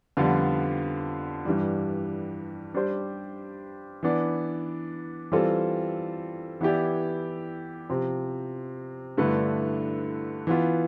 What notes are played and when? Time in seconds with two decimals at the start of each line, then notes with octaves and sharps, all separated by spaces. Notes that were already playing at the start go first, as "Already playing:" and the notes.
0.17 F2 D3 G3 B3 F4
1.45 G2 E3 G3
2.74 G3 D4 G4 C5
4.03 E3 B3 D4
5.32 E3 G3 C4 F4 A4
6.61 E3 B3 E4 G4 D5
7.90 C3 F3 C4
9.17 G2 D3 A3 E4 B4
10.47 E3 B3 F4